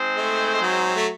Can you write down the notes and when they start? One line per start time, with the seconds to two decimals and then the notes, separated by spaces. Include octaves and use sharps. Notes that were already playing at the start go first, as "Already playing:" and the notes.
Already playing: G#3 C4 D#4 G#4 C5
0.16 A3
0.62 F#3
0.96 A3